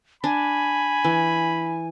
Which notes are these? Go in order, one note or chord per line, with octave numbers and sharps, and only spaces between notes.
D4 G#5 B5
E3